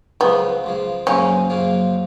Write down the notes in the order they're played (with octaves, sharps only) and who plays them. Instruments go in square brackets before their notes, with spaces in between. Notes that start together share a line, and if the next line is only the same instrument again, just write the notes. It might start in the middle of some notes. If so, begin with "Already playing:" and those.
[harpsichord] C#2 C#3 F3 [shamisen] B3
[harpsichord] C#2 C#3 F3
[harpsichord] F#2 C#3 F3 A#3 [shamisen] C#4
[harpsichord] F#2 C#3 F3 A#3